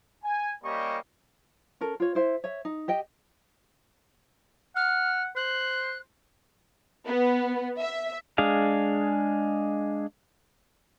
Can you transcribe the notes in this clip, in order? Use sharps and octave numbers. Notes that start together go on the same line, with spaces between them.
G#5
G3 A#3 C#4 G4 D#5 C#6
C#4 A4 A#4
F4 C#5
E4 C5 E5
C#5 E5
D#4
G4 D#5 G5
F#5 F6
C5 F#6
B3
E5
G#3 D4 G#4 F5